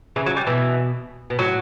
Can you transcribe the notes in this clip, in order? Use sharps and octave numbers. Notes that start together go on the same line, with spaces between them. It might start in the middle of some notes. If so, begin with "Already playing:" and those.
C#3 E3
F#3
G3
B2 E3
B2
A2 F#3